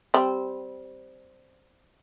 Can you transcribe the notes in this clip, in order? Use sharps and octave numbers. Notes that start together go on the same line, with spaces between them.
G3 C4